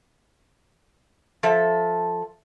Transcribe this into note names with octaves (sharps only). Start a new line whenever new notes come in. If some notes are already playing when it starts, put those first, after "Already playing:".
F3 A4 E5